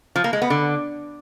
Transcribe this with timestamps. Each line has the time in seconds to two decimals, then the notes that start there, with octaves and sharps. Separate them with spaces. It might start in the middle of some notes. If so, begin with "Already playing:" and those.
0.16 F3
0.24 A#3
0.33 G#3
0.42 B3
0.50 D3